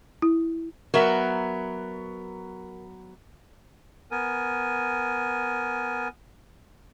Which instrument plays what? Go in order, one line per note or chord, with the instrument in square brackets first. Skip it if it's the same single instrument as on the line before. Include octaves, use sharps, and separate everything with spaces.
[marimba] E4
[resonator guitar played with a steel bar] F#3 B3 E5 [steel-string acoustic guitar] A#4
[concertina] B3 A#4 G#5